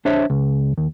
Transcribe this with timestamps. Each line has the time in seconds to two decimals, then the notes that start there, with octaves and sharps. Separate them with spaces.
0.05 D4 C5 C#5 E5
0.30 C#2
0.78 D#2